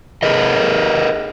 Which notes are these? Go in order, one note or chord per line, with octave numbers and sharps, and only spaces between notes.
G#4 A#4 B4 D#5